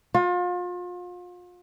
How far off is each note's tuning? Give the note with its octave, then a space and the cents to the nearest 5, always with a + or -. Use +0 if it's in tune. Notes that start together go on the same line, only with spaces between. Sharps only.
F4 +35